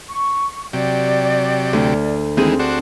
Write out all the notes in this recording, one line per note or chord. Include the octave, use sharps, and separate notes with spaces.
C#6
C3 F#3 G4 D5
D2
D#3 E3 G#3 C4 G#4
D4 F#4 C5